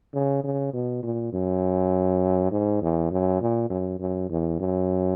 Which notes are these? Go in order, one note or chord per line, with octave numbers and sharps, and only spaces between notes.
C#3
C#3
B2
A#2
F#2
G#2
E2
F#2
A#2
F#2
F#2
E2
F#2